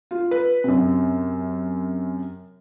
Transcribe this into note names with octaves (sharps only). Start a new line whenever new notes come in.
F4
B4
F#2 C3